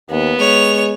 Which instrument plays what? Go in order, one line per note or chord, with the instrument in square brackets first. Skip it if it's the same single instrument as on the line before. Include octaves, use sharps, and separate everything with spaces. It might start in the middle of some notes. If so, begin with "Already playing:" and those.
[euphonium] D#2 [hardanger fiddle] B3
[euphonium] G#3 [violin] C#5 F7